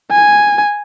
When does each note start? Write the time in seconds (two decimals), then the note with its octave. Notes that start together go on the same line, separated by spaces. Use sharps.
0.11 G#5